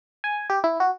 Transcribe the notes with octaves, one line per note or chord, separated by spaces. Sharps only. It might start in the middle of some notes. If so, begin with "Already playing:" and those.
G#5
G4
E4
F#4